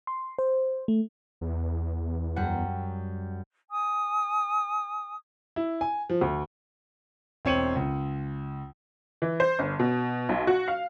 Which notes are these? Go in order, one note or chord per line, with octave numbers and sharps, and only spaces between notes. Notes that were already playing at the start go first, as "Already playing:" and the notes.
C6
C5
A3
E2
F#2 G3 F#5
G#5 D#6
E4
G#5
F3
D2
E1 C4 C#5 C#7 D#7 F#7
C#2
E3
C5
G1
B2
B1
F#4
F5